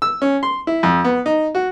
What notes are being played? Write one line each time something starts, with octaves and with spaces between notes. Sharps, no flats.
E6
C#4
C6
E4
F2
B3
D#4
F#4